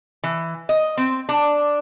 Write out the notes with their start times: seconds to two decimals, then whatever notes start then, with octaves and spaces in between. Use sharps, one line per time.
0.24 E3
0.69 D#5
0.97 C4
1.29 D4